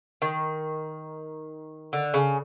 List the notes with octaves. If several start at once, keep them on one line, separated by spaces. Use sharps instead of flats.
D#3
D3
C#3